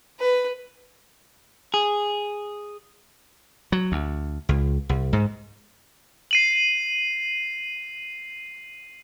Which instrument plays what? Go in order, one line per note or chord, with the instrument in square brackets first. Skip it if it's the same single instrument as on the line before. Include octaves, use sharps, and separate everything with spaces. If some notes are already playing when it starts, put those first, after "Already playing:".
[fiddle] B4
[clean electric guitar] G#4
[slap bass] F#3
D2
C#2
C2
G#2
[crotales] C7 D#7 F#7